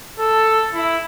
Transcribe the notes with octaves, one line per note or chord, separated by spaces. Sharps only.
A4
E4